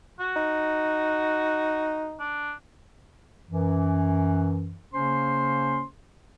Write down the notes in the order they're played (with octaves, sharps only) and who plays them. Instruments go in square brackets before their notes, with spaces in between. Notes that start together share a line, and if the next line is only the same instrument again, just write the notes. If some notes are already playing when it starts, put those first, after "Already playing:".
[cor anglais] F#4
[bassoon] D#4
[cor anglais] D4
[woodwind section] F#2 E3
C#3 A#3 C#4 C5 C6